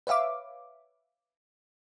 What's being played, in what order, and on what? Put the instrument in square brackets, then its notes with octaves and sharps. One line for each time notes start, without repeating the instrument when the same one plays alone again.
[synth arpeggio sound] B4 C#5 E5 F5 D6